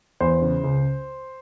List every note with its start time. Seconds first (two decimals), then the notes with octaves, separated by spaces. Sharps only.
0.20 E2 C5
0.42 C#3
0.64 C#2